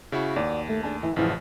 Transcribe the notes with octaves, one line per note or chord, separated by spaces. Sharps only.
C#3 E4 F#4
D#2 F#4 D5
A3
D4 G#4 A5
E3
A1 F#2 C#3 E3 F3 F5